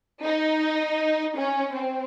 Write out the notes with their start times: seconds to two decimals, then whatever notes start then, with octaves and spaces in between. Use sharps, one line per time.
0.23 D#4
1.36 C#4
1.74 C4